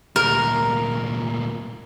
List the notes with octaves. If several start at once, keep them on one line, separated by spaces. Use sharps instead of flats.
D2 A#2 A#4